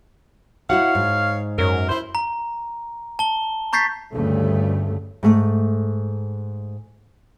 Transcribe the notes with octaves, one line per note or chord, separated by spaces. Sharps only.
E4 F#4 C#5 F5 F#5
G#2
F#2 F#3 A#4
E4 C5
A#5
A5 G7
A#5 C#6 G6 A6 B6 C7
D2 G2 C#3 A3
G#2 A3